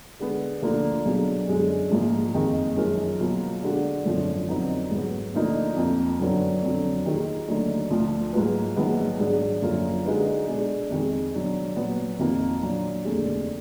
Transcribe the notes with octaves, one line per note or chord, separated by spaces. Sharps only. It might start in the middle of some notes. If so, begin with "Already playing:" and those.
D3 G#3 B3
D2 D3 F3 A#3
B1 B2 F#3 D4 G#4
F#2 D3 G#3
A#1 G#2 F3 A#3
F#1 F2 D#3 G#3
F#2 F3 G#3 D#4 A#4
B2 F#3 A#3 F4
D3 G#3 D4 F#4
G#1 F#2 D3 F3
F2 D3 F#3 B3 D#4
G#2 F#3 B3
D2 D3 F3 A#3 D#4
F2 F3 A#3
F#2 D3 F#3 B3 D4
F2 D3 F#3
D#2 D#3 A#3 F4 G#4
D2 D3 F#3 A#3 D#4
D2 D3 F3
G#2 F#3 A#3 F4 B4
A#1 G#2 D#3 F#3 B3
G#2 F#3 D4 G#4
F#2 D3 F3 A#3 F4
D3 G#3 D#4 F#4 B4
B2 G#3 D4
F2 D#3 G#3
B2 F#3 D4
A#2 F#3 B3
F2 D#3 A#3 F4 A#4
A#2 F#3 D4
F1 D#2 D3 G#3